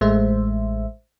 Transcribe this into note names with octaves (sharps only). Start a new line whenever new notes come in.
A1 G#3 A3 C5 E5